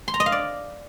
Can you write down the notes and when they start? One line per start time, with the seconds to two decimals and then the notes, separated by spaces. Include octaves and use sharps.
0.08 C6
0.14 A#5
0.20 D#5
0.26 F5
0.32 D5